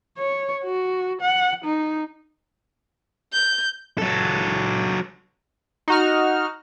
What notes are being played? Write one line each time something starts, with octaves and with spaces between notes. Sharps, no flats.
C#5
F#4
F#5
D#4
G6
F#3 A4
D#4 F#4 F6